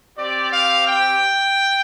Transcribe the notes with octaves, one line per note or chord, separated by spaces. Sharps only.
C4 G4 D5
F5
G5